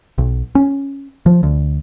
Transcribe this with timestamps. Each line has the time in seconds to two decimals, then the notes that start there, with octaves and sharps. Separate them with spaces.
0.18 B1
0.55 C#4
1.26 F3
1.43 D2